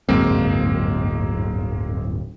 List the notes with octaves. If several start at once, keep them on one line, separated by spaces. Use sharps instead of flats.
D1 G1 F#2 G#3 A#3 C4